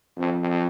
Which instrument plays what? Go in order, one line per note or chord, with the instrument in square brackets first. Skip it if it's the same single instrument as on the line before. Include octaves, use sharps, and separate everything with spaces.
[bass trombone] F2